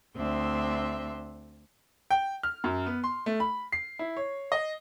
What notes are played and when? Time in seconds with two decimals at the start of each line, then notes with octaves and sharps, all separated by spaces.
0.16 D2 C4 D4 E5 C6
2.11 G5
2.43 F6
2.64 F#2
2.86 B3
3.04 C6
3.26 A3
3.40 B5
3.72 C7
3.99 E4
4.17 C#5
4.52 D#5